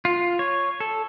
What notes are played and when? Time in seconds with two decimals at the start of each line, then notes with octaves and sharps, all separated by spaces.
0.05 F4
0.39 C#5
0.80 A4